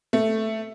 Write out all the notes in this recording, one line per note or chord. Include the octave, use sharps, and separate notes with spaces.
A3